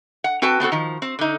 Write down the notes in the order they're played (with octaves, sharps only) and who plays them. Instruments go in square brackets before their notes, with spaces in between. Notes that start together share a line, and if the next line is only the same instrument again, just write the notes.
[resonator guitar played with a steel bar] F#5
C4 F#4 B4 G5 A5
B3 C4 F#4 A4
D#3 F3
C4
D3 D#4